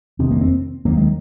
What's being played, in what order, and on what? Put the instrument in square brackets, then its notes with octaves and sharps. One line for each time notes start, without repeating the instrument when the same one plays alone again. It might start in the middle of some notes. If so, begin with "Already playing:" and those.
[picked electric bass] F2 C3 D#3 [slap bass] C4
[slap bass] A#3
C4
[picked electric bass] D#2 D#3 F#3 [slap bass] A#3
[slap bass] G#3